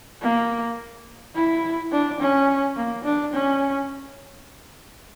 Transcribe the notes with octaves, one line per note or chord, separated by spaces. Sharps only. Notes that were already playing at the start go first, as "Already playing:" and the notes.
A#3
E4
D4
C#4
A#3
D4
C#4